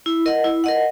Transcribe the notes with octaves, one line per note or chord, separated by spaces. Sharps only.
E4
A#4 D#5 F#5
E4
A#4 D#5 F#5